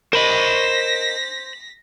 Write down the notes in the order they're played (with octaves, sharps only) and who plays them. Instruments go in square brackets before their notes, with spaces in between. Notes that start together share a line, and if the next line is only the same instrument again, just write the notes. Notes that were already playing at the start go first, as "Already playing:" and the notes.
[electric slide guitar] A#4 D#5 [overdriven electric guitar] C5 B5 [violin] A#6 B6